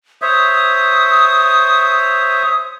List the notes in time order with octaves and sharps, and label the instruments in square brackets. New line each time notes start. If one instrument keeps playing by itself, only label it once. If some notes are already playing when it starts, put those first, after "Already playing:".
[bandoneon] C5 C#5 E5 [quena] D#6